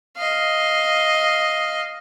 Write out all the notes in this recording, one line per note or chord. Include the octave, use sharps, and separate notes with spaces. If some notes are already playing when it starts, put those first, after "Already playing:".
D#5 F5